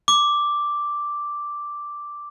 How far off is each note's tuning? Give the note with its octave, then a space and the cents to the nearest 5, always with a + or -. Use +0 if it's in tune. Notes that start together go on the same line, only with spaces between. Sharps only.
D6 +0